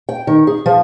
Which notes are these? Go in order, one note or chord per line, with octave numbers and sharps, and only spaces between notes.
G5
D#3
G#4
F3